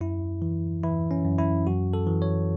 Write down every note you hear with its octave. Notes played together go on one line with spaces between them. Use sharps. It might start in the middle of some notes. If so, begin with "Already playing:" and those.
F#2 E4
E3
E3 E4
C#4
F#2
E4
F#2 F#4
A4
E3
C#5